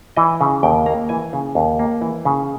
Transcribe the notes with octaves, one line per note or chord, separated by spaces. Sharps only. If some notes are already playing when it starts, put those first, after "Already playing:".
E3 D#5
C#3
D#2 G5
A#3 A#5
E3 G#5
C#3
D#2
A#3
E3
C#3